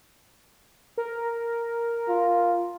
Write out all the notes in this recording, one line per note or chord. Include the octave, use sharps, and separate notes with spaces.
A#4
F4